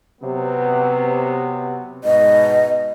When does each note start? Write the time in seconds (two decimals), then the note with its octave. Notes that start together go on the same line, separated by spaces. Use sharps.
0.21 C3 F#3 B3
2.04 G#2 B2 D#5